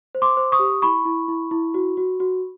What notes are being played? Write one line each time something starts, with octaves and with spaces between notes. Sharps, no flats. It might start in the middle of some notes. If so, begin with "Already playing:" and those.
C5
C6 D6
C5
C#6 D#6
G4
E4 B5 C#6
E4
E4
E4
F#4
F#4
F#4